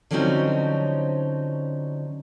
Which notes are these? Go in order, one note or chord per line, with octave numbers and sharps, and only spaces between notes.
D3 F3 F#3 C4 C#4 D#4